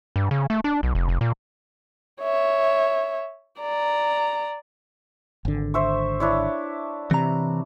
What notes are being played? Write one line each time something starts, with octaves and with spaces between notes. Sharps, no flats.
G2
C#3
A3
D4
B1
F1
F1
A#2
C#5 E5
D5 A#5
G#1 D3
C5 E5 C#6
D4 E4 C#5
C3 E3 A#5